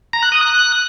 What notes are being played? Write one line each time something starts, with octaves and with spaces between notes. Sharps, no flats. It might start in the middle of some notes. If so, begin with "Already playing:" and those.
A#5
F#6
D#6
F#6